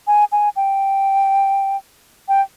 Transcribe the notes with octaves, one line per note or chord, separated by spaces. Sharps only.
G#5
G#5
G5
G5